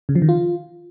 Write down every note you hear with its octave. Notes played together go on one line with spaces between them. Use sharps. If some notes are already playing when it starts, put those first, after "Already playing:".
C#3
F3
D#3
F4